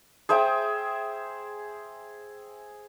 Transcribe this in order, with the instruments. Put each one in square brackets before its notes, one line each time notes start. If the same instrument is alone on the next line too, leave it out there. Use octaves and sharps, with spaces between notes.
[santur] G#4 C5 E5 G5